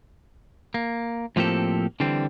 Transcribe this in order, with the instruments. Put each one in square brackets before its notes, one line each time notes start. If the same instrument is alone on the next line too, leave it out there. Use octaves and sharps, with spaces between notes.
[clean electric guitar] A#3
A2 F3 A#3 C4 G4 A4
D3 E3 G3 C4